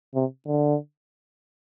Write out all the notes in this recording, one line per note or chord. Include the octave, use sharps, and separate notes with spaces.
C3
D3